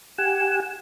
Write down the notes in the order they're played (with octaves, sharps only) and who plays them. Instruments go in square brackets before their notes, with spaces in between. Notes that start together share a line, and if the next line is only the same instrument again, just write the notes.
[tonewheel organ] G4 F#5 G#5 [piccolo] E7